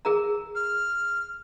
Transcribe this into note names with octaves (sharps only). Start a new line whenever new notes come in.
G#4 A#4 A#5
F6